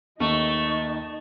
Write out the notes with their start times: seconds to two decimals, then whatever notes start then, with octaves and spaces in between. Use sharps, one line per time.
0.20 D#2 A3 D#4 D#5 C#6